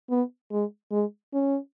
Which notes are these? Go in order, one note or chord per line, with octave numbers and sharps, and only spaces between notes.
B3
G#3
G#3
C#4